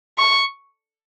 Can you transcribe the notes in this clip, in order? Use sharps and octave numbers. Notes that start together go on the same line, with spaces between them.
C#6